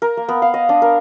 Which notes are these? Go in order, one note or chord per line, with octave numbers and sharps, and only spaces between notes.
A#4
A#3
B3
F5
D#5
D4
A#4